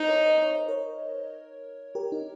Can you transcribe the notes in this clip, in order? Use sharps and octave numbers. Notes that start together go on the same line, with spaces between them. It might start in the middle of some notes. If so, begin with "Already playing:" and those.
Already playing: D#4 C5 D#5
A#4 C#5
C5 D#5
C#5
D#5
A#4 C#5
G4 A#4
D#4